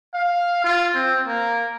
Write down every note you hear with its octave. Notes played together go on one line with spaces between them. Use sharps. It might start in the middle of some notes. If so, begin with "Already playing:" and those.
F5
F4
C4
A#3